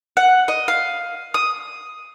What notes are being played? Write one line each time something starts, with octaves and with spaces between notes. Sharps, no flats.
F#5
D#5
F5
D#6